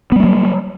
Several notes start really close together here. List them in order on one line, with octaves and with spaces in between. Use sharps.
B3 G3 A#3 F#3